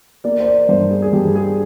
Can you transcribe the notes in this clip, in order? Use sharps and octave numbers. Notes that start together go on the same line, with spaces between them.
A#3 D5
C5
D5
G2 C5
G#4
G#4
G2 G4
G#4